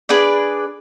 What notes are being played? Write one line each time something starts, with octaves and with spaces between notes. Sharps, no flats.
D4 G#4 B4 D5